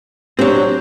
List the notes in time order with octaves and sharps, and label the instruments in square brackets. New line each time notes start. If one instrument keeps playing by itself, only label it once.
[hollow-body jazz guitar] F#3 C4 [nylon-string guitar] D4 G4 C5